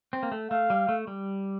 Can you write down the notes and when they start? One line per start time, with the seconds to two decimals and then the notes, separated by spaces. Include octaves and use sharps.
0.13 C4
0.23 A#3
0.32 A3
0.51 A3 F5
0.70 G3
0.89 A3
1.07 G3